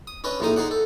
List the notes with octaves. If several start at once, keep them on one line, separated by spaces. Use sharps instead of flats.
D#6
C#4 D4 B4 D#5
A#1 A2 G#3 A#3 D#4 D#6
D#4 G#4 D5 F#5
A4